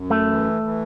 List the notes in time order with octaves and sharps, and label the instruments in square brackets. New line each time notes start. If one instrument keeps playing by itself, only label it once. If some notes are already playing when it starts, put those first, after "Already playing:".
Already playing: [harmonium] F#2
[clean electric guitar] A3
[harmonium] E3
E3